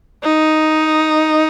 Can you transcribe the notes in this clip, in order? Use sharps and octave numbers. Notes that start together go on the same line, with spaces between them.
D#4